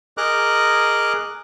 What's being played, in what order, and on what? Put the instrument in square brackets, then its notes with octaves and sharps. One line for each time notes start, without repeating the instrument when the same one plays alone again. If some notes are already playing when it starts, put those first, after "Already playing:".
[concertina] G#4 A#4 D#5 A#5 D6 F#6